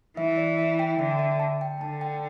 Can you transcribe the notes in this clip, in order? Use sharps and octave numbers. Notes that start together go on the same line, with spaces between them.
E3 E5
D5
E5
G5
D3 E5
G5
E5
A5
G5
D3 A5
G5